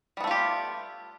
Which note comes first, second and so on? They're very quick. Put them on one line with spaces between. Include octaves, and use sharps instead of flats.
G3 B3 A3 F4 G4